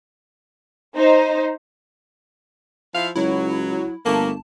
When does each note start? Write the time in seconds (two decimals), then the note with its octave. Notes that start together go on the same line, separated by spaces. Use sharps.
0.96 D#4 C5
2.94 F3 E4 F5
3.16 C#2 F#3 E4
4.06 G1 A3 A#3 A5